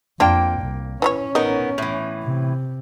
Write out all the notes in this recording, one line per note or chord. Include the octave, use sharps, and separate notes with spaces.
F2 A#3 D4 F4 G5
C2
E3 C#4 D#4 C#5
B3 D#4 A#4 D#5
A2 E3
C3